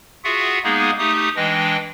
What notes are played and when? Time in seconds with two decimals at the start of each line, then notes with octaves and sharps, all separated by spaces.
0.24 F4 F#4 G#4 E5 F#5
0.64 G#3 A#3 B3 D#4 G#4
0.99 A3 D#4 G4 D#6
1.36 E3 G#3 D4 D#5 G5